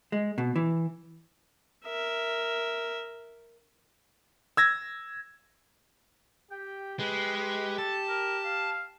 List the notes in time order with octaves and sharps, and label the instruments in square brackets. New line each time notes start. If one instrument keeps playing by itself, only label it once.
[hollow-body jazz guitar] G#3
B2
E3
[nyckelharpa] A#4 E5
[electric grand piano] E6 G#6 A#6
[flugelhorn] G4 [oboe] G5
[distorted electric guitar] G#3 [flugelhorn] G4 [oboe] B4
[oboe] B4
[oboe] A4 [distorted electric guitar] A5
[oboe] A#4
F5